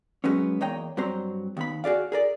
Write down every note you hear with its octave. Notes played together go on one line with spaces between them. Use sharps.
F#3 G#3 B3 C#4
E2 A#3 C#5 D#5 G5 A#5
G2 F#3 C4 C5 A#5
D#2 B3 B5
F#4 G#4 D5 F5
G#4 A#4 D5